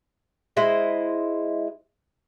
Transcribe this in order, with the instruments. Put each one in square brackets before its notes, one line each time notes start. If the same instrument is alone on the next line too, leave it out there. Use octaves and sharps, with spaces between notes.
[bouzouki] G#3 E4 C5 D#5